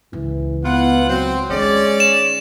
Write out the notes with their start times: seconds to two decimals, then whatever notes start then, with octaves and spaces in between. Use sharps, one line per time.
0.13 C#2 E3
0.63 B3 E4 F4 F#5
1.08 F#3 C4
1.50 D#3 G#3 C#4 D5
2.00 E7